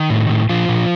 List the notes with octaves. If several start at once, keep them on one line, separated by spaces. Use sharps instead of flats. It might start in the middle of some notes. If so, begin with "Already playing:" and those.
Already playing: D#3 D#4
A2
A2
A#2 F3 F4
A#2